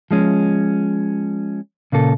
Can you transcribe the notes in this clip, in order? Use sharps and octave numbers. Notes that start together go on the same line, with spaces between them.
F3 G#3 C#4
A#2 C#3 A#3 A4